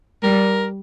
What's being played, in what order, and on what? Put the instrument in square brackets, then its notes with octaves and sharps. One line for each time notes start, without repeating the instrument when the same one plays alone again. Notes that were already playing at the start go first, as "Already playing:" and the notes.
[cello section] G3 [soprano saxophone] A#4